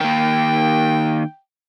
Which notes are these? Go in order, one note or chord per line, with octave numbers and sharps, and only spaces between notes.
D#3 A#3 G5